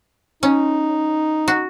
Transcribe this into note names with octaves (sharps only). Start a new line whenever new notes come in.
C#4 D#4
F#4